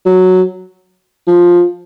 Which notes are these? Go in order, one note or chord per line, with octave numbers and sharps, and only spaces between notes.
F#3
F3